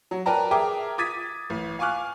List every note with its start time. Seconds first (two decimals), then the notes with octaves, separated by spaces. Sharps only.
0.11 F#3
0.26 A#4 B4 D5 G5 A5 A#5
0.51 G#4 A#4 E5 G5 D6
0.98 D6 D#6 G#6 A6 B6 D#7
1.50 A1
1.79 F5 G#5 C#6 D6 F6 F#6